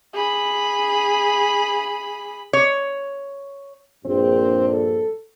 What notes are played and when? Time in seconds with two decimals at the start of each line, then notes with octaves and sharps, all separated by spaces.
0.13 G#4 B5
2.53 C#5
4.05 A#1 G2 C4
4.69 A4